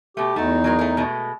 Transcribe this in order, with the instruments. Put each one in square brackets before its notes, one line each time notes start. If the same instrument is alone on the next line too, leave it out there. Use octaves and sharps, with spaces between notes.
[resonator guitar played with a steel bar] B2 A3 [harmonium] G4
[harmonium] E2 D#4 [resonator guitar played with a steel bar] A3 F#4
[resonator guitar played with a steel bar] F#3 G#3 A#4
A3 G#4 A#4
B2 G#3 A3